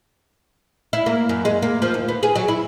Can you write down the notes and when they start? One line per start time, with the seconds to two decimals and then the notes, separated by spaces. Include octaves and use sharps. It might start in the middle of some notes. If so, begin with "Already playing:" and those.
0.93 E4
1.06 A#3
1.29 F#2
1.45 G#3
1.62 A#3
1.82 F3
1.94 D#2
2.08 B3
2.23 G#4
2.36 F#3
2.48 E4